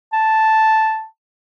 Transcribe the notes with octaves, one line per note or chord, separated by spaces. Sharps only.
A5